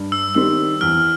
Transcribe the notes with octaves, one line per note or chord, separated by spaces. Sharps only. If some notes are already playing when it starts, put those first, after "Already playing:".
Already playing: G2
E6
D#3 G3 C4 E6
E2 F6